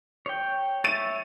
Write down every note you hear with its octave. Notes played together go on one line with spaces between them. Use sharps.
C#5 G5
C#5 E5 A6 D#7